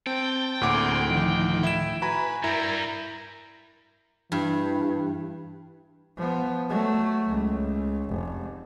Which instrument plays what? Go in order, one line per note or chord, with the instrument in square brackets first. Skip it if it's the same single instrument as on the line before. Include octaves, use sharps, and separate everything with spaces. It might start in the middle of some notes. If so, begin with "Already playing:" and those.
[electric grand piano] C4 [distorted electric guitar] G5 [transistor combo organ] A5
[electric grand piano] D2 F#5 D6 [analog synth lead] A2 [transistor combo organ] A#3 C4 G#4
[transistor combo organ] D#3 F3
[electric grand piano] E4 E7
[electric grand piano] F#4 A#5 B5 [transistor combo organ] B4 [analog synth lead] G#5
[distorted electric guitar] G2 G3 [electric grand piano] E4 [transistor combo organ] A#4 [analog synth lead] A#5
[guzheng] G2 [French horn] E3
[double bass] F3 B3
F#3 A3
C#2
F1